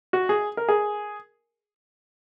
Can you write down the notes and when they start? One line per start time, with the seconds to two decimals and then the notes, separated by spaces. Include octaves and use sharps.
0.13 F#4
0.29 G#4
0.57 A#4
0.69 G#4